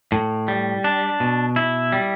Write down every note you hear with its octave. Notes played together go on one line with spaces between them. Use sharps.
A2
G3
D4
B2
E4
G3